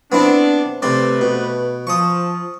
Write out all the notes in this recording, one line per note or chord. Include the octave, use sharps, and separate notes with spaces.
B3 C4 D4 E4
C3 A3 C4 B4 D5
B2
F3 C#6 D#6